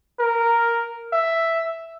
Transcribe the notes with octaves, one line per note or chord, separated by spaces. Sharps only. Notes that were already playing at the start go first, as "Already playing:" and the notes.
A#4
E5